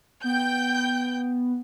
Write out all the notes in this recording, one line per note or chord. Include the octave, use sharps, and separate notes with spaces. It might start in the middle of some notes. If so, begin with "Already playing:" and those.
B3 G5 G6